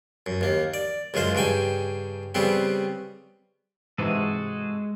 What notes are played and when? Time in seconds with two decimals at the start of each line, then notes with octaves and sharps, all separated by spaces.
0.26 F#2
0.41 D#2 A#3
0.74 D5
1.14 C#2 F#2 G#3 F4 C5
1.35 G2 C#3 G5 G#5
2.35 C#3 G3 B3 C4
3.98 G#2 C3 E3 G#3 F#4 G#4 A4